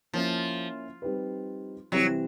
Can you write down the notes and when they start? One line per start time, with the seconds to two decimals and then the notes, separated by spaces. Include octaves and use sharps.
0.13 F3 A#3 C#4 E4
1.02 G3 C4 D#4 G4 B4
1.92 C3 E3 F#3 G3 C4 E4